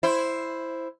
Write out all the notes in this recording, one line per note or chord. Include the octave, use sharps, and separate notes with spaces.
E4 C5